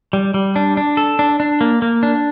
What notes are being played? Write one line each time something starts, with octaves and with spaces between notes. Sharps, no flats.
G3
G3
D4
D4
A4
D4
D4
A#3
A#3
D4